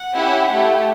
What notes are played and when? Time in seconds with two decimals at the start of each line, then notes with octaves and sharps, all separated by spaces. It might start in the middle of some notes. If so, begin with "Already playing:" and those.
Already playing: F#5
0.16 C#4 E4 G4
0.51 A3 E4 G4